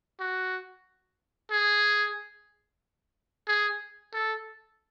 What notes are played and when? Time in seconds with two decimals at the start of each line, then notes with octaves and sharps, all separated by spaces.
0.20 F#4
1.51 G#4
3.48 G#4
4.14 A4